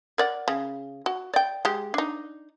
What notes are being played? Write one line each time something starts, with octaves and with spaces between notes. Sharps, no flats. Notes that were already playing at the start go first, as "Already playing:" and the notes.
A#4 D5 F#5
C#3
F#4
D5 G5
G#3 G4
D4 D#4